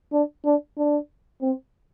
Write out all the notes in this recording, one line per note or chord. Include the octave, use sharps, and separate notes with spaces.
D4
D4
D4
C4